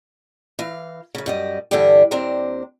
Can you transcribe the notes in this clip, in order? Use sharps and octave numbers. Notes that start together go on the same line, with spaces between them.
E3 F5
F#2 C#3
F#2 G3 D#5
G2 D3 E3 G3 D4 G4
D#2 C4 D4 G4 C5 A#5